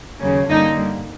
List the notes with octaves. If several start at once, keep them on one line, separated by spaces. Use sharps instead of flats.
D#2 C#3 F#3 A#3 C#4
G2 D3 G3 A#3 D#4